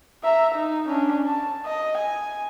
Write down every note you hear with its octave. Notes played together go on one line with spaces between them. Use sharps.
E5 A#5
D#4
C#4 D4
A5
D#5
G#5